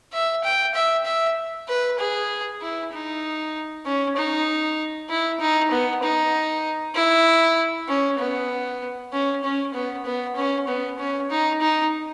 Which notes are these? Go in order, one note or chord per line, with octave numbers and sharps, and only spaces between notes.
E5
G5
E5
E5
B4
G#4
E4
D#4
C#4
D#4
E4
D#4
B3
D#4
E4
C#4
B3
C#4
C#4
B3
B3
C#4
B3
C#4
D#4
D#4